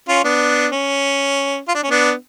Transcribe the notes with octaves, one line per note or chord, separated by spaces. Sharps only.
C#4 F4
B3 D4
C#4
F4
D4
C#4
B3 D4